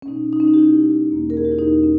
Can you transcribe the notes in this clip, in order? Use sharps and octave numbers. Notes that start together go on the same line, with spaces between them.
C#4
B2 G#3 B3 D#4
D#4
C#4
D#4
G4
B2 G#3 B3 E4
E2 B2 A#3
A#4
G#4
G4
E4
E2 B2 A#3 D#4
C#4